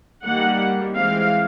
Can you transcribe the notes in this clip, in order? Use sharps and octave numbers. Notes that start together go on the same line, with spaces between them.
D#3 G3 A#3 F#5
E3 G#3 C4 F5